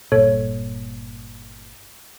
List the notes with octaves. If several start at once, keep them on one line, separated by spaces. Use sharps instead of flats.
G1 A#2 A4 C#5